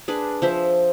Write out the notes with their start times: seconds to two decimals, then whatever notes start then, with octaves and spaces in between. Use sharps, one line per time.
0.08 D4 G#4 B4
0.42 F3 C5 E5